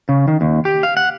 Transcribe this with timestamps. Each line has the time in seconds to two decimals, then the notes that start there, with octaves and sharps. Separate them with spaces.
0.09 C#3
0.28 D#3
0.41 D#2
0.65 G4
0.83 F5
0.97 F#5